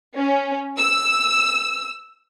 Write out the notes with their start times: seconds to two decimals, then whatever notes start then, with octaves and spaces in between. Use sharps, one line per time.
0.17 C#4
0.77 E6